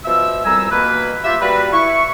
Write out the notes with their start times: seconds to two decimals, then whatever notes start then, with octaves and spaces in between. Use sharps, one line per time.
0.05 B2 F3 E5 E6
0.45 C2 F2 G3 G#5 A#5 E6
0.71 B2 A#3 B4
1.24 F4 G4 E5
1.41 G3 A#3 F#4 B4
1.73 E4 C#6